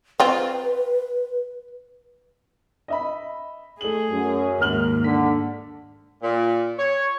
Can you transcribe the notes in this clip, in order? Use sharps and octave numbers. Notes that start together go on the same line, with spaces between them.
C4 F4 B4
D#5 E5 B5
A3 G#4 F#7
F#2
D#2 G#2 A#4 F6 F#7
D3 B6
A#2
C#5